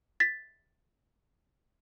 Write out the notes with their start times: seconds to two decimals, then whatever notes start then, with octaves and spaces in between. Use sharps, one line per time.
0.20 A6 B6